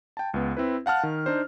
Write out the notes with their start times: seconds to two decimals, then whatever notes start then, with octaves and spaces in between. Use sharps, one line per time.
0.17 G5 A5
0.34 C#2 B3
0.57 C4 E4 B4
0.86 F5 F#5 A5 F6
1.03 D#3
1.26 D4 D#4 C5